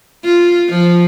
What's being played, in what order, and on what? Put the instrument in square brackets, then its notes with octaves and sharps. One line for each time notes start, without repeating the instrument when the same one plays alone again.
[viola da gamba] F4
F3